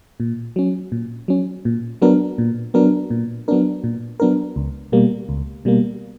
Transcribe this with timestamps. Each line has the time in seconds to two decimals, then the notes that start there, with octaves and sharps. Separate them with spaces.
0.20 A#2
0.56 F#3 C#4
0.92 A#2
1.28 F#3 C#4
1.65 A#2
2.02 F#3 B3 D4 A#4
2.38 A#2
2.74 F#3 B3 D4 A#4
3.10 A#2
3.48 F#3 B3 D4 A#4
3.84 A#2
4.20 F#3 B3 D4 A#4
4.56 C#2
4.92 B2 G3 A#3
5.29 C#2
5.65 B2 G3 A#3